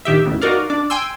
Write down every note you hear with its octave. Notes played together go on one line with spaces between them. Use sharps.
A#1 D#3 G4 E5
A1 D#2 C#3
D#4 F#4 A#4 D5 F5
D4 D5
G5 G#5 C6 E6